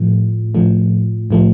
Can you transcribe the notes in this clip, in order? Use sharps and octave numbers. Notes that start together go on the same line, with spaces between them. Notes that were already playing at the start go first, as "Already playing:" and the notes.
Already playing: A2 F3 A3
A2 F3 A3
A2 F3 A3